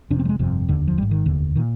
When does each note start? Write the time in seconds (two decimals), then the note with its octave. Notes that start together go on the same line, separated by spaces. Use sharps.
0.10 F1 F2 C3 D4
0.19 C4
0.25 G3
0.29 G#3
0.39 G1 F2 C3
0.68 F1 D#2 D3
0.87 F3
0.97 G#1 G3
1.02 G#2
1.11 D#3
1.26 F1 D#2 D3
1.55 A#2 D#3